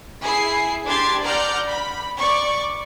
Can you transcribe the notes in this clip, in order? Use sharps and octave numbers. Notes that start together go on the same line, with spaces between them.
E4 G#4 C7
D4 G4 C6 G#6 A6 C7
D5 F#5 A#5 F6 G6
B5
D5 C#6